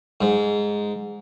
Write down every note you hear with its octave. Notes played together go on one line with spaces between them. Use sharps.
G#2